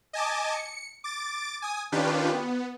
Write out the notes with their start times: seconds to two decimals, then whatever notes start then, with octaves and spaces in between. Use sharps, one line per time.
0.13 D#5 G#5 A5 D6
0.53 C#7
1.04 D6 A6 D7
1.62 G#5 D#6
1.92 D#3 C#4 D4 F4 G4 B4
2.33 B3